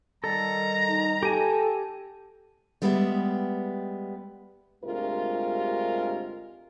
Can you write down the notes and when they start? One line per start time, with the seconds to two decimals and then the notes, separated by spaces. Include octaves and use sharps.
0.24 D#3 G3 A4 A#5
0.88 D#4
1.23 G4 A4 G#5
2.82 G3 G#3 B3 G4 G#4 E5
4.84 D2 G2 C3 G#3 F4 A#4